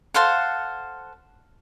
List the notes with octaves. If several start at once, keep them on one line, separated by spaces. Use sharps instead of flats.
A4 C5 F5 F#5